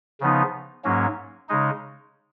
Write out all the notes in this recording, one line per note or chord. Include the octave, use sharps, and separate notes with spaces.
C#3 F3 B3 D#4
G#2 F#3 A#3 C#4
C#3 G#3 D#4